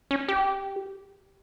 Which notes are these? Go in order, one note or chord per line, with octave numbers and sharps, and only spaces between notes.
C#4
G4